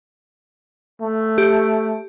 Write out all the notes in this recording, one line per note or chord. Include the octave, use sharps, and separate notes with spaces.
A3
G4